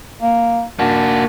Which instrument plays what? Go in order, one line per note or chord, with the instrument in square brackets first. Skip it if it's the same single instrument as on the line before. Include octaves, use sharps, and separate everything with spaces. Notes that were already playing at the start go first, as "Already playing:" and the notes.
[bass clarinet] A#3
[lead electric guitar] A#3 F#4 [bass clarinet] D4